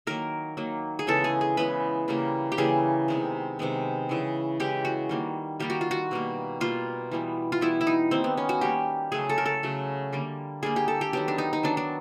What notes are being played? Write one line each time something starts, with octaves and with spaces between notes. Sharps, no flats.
D#3 F#3 A#3 A#4
D#3 F#3 A#3
G#4
C#3 E3 G#3 B3 A4
G#4
G#4
C#3 E3 G#3 B3 B4
C#3 E3 G3 A#3
G4
C#3 E3 G3 A#3 G#4
C3 D#3 G#3 B3
C3 D#3 G#3 B3
C#3 E3 G#3
C#3 E3 G#3 G4
F#4
D#3 G3 A#3
D#3 G3 A#3 G4
F#4
F4
F#4
B2 G3 A#3
B2 G3 A#3 F4
E3 G3 B3
F4
E3 G3 B3 E4
E4
D#4
D#3 G3 A#3 C4
B3
C#4
F#4
D#3 G3 A#3 G4
C#3 F#3 A3 G#4
A4
A#4
A4
C#3 F#3 A3
D3 G3 A#3
D3 G3 A#3 G#4
G4
A4
G4
D#3 F#3 B3 G4
D4
D#4
D#4
D#3 F#3 B3 D4
D4